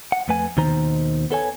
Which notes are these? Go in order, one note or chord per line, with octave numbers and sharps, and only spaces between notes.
F#5
F2 A3 B4 G#5
D#2 B2 D#3 D#4 C5 A#5
B3 A4 C#5 G#5